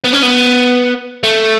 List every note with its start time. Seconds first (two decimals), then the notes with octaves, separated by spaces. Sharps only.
0.04 B3
0.13 C#4
0.22 B3
1.23 A3